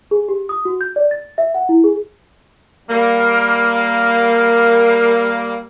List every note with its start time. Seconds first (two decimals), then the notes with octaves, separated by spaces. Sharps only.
0.11 G#4
0.29 G4
0.49 D#6
0.65 F#4
0.81 G6
0.96 D5
1.11 A6
1.38 E5
1.54 F#5
1.69 E4
1.84 G#4
2.89 G3 A#3